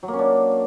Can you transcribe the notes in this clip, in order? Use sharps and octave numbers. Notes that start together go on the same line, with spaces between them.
F#3
A#3
C#4
D4